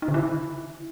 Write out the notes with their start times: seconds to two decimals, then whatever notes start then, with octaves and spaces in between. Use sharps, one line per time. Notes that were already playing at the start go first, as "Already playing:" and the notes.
0.02 D#4
0.08 D3
0.14 E4